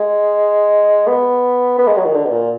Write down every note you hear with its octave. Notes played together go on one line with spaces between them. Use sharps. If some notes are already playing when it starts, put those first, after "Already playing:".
Already playing: G#3
B3
B3
G#3
F#3
D#3
D3
B2
A#2